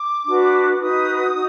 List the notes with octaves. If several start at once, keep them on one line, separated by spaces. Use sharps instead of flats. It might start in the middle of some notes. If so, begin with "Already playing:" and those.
Already playing: D6
D4 F#4 B4
D#4 F#4 B4 D#6
D#4 F#4